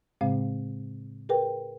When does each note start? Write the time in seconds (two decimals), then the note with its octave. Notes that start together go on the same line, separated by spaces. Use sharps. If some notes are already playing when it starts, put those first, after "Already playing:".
0.21 A2 C#3 G#3 C4 F5
1.29 G#4 A#4 B4 G5